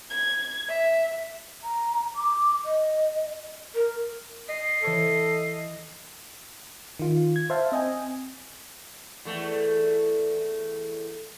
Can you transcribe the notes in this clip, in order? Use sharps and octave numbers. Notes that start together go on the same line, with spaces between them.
G#6
E5
A#5
D6
D#5
A#4
D#5 C7
E3 A4 C#5 C#7
D#3 F4
G#6
C5 E5 F5 A5
C4 D#5 G5 G#5
E2 A3